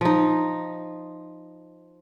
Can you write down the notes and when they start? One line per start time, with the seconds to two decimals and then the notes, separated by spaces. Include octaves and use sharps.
0.01 F3 D#4